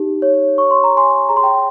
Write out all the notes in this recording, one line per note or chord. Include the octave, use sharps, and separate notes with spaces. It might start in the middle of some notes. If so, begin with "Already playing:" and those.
Already playing: D#4 G4
C#5
C#5 C#6
C6
A#5
C#5 G#5 C6
G#4 A#5
C6
G5 A#5